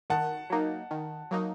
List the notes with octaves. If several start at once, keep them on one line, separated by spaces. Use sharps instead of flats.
D#3 F#5 A5
F#3 A#3 D#4
D#3
F#3 A#3 D#4